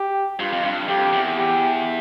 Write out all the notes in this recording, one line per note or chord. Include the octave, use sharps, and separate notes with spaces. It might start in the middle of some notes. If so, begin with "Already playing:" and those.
Already playing: G4
G2 F4
F2
G2
F2 G4
E2
G4